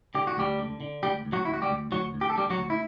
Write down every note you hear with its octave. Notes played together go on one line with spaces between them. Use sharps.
D3 G4
F#4
D2 G3 G4
D3
D3
D2 G3 G4
D2
F#3 F#4
D2 E4
F#4
G3 G4
D2
D2 F#3 F#4
D2
G4
A4
D3 G3 G4
F#3 F#4
D2
E4